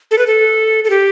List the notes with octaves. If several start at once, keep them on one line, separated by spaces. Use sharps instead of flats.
A4
B4
A4
A4
G4